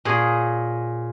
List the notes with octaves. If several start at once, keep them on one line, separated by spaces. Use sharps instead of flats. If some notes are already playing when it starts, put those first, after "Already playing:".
A#2 G#4 C#5